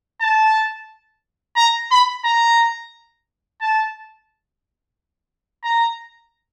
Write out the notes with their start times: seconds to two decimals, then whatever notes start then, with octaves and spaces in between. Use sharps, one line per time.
0.21 A5
1.56 A#5
1.91 B5
2.25 A#5
3.61 A5
5.64 A#5